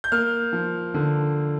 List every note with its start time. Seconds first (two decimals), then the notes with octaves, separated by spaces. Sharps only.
0.04 G6
0.12 A#3 F6
0.53 F3
0.94 D3